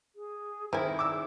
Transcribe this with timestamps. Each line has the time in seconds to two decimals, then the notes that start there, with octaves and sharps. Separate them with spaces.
0.16 G#4
0.73 D#3 C4 E4 G#4 A#4 G#5
0.99 D6 E6